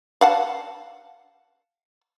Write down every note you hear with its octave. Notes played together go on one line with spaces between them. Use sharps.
F5 F#5 A5